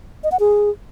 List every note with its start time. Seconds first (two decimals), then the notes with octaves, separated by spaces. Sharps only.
0.24 D#5
0.32 F#5
0.40 G#4